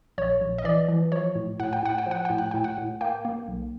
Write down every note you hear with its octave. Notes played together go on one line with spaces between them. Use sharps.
A#1 C#5
A#1
D#5
E3 D5
E3
F3 C#5
A2
A2 F#5
G5
A2 F#5
G5
F3 F#5
A2 G5
F#5
A2 G5
F#5
A2
A#3 G5
A#3
B1